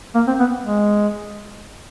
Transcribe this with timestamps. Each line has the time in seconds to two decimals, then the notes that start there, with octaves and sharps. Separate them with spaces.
0.15 A#3
0.27 C4
0.40 B3
0.64 G#3